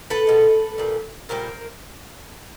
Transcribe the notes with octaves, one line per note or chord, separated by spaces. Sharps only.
A4 B4
B2 G#3
A#2 G3
A#2 G3 A#4 C5